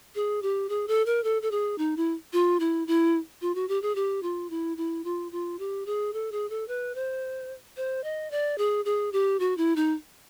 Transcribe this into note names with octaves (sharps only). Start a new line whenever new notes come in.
G#4
G4
G#4
A4
A#4
A4
A4
G#4
D#4
E4
F4
E4
E4
F4
F#4
G4
G#4
G4
F4
E4
E4
F4
F4
G4
G#4
A4
G#4
A4
B4
C5
C5
D#5
D5
G#4
G#4
G4
F#4
E4
D#4